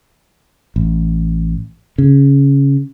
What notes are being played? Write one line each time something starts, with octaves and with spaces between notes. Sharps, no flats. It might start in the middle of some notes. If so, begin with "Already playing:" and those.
A1
C#3